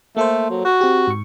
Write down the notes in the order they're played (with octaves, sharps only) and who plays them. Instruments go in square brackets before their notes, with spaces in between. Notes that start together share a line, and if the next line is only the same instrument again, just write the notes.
[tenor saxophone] A3 [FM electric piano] A#3 A4 C5
[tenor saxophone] F#3
F#4
[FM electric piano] C4 G4
G#2 C#6